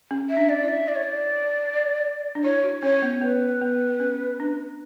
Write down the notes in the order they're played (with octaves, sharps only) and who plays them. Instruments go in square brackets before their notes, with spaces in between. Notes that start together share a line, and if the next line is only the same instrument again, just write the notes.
[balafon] C#4
[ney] E5
[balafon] D4
[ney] D5
[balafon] E4
[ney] E5
D5
C#5
D5
[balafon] D4
[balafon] E4 [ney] C#5
[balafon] F#4
[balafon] C#4 [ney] C#5
[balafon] B3
[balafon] B3 [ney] B4
[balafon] B3
C#4
D4